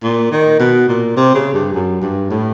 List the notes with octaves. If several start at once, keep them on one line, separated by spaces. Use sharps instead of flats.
A#2
D#3
B2
A#2
C3
C#3
G2
F#2
G2
A2